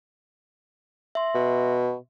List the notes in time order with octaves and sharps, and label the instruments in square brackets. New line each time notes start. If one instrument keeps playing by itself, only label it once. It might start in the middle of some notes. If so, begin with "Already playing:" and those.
[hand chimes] E5 C6
[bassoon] B2